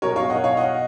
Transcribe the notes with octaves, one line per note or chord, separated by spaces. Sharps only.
B2 F#3 A#4 C#5
C#5 F5
D#5 F#5
C#5 F5
D#5 F#5